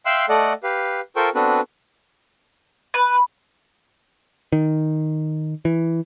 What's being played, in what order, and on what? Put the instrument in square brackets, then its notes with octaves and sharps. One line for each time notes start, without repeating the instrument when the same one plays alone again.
[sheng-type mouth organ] E5 F5 G5 C6 E6 F#6
A3 A4 D5 D#5 F#5
G4 B4 F5
F4 A4 A#4 C5 G5 C#6
B3 C4 D4 F#4 A4 B4
[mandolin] B4
[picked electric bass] D#3
E3